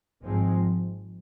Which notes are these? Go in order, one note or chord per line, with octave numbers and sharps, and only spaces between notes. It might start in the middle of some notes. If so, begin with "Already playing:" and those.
G#1 G#2 F3 G#3 C4